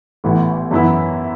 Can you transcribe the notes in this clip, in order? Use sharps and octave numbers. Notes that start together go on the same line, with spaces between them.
A1 A2 E3 B3
F#2 E3 B3 E4